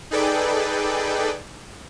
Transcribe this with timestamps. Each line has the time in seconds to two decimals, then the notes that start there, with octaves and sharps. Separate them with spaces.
0.11 D#4 G#4 A4 B4 D5 G5